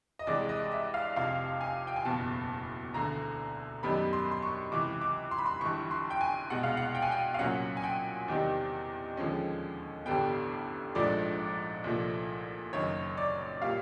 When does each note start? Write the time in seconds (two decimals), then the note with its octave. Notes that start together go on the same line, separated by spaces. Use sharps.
0.19 D#5
0.27 C2 C3 E3 G#3 D5
0.49 D#5
0.71 E5
0.94 F5
1.16 F1 F2 C3 F5
1.61 G#5
1.87 G5
1.96 G#5
2.05 F#1 E2 B2 A5
2.94 E1 D2 D3 A#5
3.83 F#2 D#3 G3 B3 B5
4.13 C6
4.31 C6
4.42 C#6
4.72 C#2 C3 E3 D6
5.01 D6
5.31 C6
5.38 B5
5.46 C6
5.61 G1 G2 E3 C#6
5.91 C6
6.10 G5
6.21 G#5
6.50 C2 B2 G#3 F#5
6.63 F5
6.77 F#5
6.95 G5
7.02 G#5
7.11 G5
7.34 F5
7.39 C2 A#2 F#3 A#3 C#4 F#5
7.77 G#5
7.83 G5
8.28 E2 C3 D#3 G3 C4
9.17 D#2 D3 F3 G#3 C#4
10.06 A1 G2 D3 G3 B3 G5
10.95 A#1 G#2 F3 A3 D4 D5
11.84 C2 A#2 F3 A3
12.73 F#1 F#2 D#3 C#5
13.17 D5
13.61 A#2 G3 F5